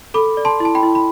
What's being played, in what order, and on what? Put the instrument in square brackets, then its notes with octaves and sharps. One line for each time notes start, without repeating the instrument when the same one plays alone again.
[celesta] A4 B5 D6
D5
A5 C6
E4 A5
G5 B5
E4
B5